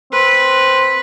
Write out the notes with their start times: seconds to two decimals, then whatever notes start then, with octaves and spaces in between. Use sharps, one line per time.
0.13 C4 B4